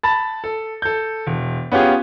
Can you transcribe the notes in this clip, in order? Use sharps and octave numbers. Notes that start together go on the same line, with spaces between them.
A5 B5 A6
A4
A4 G6
E1
B3 C#4 F4 G4 G#4